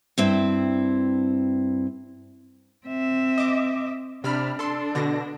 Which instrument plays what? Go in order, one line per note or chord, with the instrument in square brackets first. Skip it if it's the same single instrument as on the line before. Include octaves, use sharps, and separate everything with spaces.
[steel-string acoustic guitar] G2 C4 E4
[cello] C4 E5
[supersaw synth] D#5 D6
[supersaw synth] C3 B5 F6 [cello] D4
[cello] D4 [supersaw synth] A4 C6
[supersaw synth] B2 D3 A#6